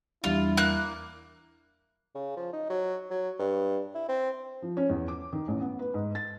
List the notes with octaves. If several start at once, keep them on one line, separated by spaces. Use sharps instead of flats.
E2 G3 D4 E4 F4
A#3 F#6
C#3
F3
D#4
F#3
F#3
G2
E4
C4
F3
C#4
E2
D6
D#3
A1
B3
B4
G#2
A6